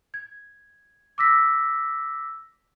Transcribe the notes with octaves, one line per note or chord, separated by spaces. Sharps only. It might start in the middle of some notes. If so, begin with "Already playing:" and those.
G#6
D6 E6 A#6 B6